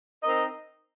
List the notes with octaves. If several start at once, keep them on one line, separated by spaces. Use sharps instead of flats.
C4 D#4 A#4 D#5